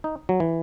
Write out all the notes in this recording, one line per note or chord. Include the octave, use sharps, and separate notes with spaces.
D#4
F#3
E3